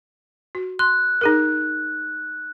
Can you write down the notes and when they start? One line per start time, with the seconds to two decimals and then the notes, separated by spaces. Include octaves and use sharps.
0.55 F#4
0.79 C6 F#6
1.21 D#4 G#4 A#4